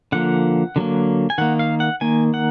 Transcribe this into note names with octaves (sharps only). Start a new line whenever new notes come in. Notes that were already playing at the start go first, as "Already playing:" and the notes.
D3 F3 A#3 F#5
D3 F#3 A#3
G#5
D#3 A#3 F#5
F5
F#5
D#3 A#3 G#5
F#5